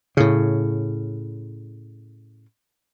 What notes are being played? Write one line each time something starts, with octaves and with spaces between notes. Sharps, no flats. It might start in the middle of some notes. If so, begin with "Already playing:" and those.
A2 C#3